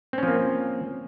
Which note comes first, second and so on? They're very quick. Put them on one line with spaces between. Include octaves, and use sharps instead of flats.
C4 C#4 F3 A#3